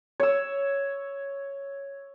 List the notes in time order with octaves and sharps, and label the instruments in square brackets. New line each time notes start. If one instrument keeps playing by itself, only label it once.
[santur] C#5 E6